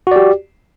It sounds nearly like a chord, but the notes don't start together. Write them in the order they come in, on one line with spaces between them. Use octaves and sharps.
F#4 D5 G4